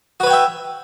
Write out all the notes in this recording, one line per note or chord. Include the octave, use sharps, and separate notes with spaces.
F#4 B4 C#5 E5 G5